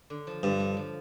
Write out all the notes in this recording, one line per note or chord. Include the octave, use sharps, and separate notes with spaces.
D3
F3
G2 D3
D3
F3